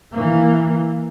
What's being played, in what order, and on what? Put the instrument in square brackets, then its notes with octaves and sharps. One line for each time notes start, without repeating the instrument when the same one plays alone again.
[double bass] E3 A#3